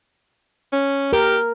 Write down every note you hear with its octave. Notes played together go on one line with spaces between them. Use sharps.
C#4
G4 A#4